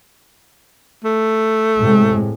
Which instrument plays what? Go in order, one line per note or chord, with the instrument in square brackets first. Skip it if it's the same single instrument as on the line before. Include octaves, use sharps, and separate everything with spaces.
[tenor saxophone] A3
[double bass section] A2 C3 G#3